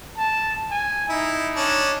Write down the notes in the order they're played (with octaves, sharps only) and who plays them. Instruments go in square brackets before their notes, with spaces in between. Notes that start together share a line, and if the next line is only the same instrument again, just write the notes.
[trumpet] A5
G#5
[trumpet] D#4 [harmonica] E4
[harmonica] C#4 D4